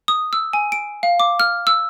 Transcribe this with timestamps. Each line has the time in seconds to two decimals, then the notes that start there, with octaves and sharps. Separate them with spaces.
0.08 D#6
0.33 E6
0.53 G#5
0.72 D7
1.03 F5
1.20 D6
1.40 F6
1.67 E6